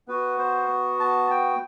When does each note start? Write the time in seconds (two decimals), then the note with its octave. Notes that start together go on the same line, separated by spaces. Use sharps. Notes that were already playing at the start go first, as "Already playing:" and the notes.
0.08 B3 F#4 B4
0.39 C5
1.00 A5
1.30 G5